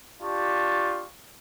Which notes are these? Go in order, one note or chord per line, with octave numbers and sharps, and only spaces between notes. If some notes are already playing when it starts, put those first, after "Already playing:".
D4 F4 G4 A5 C#6